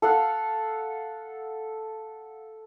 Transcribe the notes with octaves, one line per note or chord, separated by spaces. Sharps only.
A4 F5 F#5